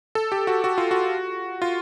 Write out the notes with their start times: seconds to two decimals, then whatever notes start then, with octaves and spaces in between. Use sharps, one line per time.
0.15 A4
0.32 G4
0.47 F#4
0.64 F#4
0.78 F4
0.91 F#4
1.62 F4